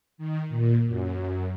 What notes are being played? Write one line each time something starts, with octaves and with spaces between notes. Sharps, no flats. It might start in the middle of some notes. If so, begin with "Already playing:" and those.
D#3
A#2
F#2